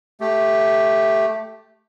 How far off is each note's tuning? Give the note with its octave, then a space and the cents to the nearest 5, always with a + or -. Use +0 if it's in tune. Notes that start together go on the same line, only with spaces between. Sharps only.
A3 +0 G4 +0